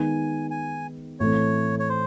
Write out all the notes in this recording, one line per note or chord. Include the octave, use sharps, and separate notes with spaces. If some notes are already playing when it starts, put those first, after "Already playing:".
Already playing: D#3 G#3 B3 D#4 G#5
G#5
A2 E3 A3 C4 C#5
C#5
C5